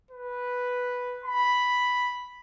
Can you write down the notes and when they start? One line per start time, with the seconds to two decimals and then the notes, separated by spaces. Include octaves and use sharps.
0.11 B4
1.25 B5